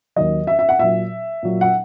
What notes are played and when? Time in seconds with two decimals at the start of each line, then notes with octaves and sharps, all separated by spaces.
0.16 D#2 D#3 F#3 D#5
0.47 E5
0.59 E5
0.69 F#5
0.79 A#2 F#3 E5
1.43 A#2 F#3
1.61 F#5